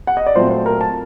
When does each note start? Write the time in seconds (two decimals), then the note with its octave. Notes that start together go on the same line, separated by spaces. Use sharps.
0.07 F#5
0.17 D#5
0.27 D5
0.35 A#2 F#3 A3 C4 C5
0.51 C5
0.66 A#4
0.81 A5